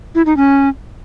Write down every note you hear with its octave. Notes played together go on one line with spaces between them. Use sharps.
E4
D#4
C#4